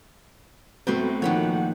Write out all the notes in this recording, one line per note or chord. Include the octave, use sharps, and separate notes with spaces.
A2 F#3 B3 C4 B4 C5
D#3 F3 A#3 B4 C#5 F#5